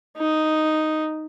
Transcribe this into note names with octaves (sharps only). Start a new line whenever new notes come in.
D#4